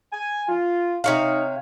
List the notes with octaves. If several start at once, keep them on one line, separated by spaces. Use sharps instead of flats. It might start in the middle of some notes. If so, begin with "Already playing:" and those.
G#5
F4
C3 D#4 C#5 F5